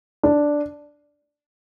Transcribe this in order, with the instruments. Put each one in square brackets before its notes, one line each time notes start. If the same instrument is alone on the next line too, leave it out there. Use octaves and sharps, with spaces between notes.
[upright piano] D4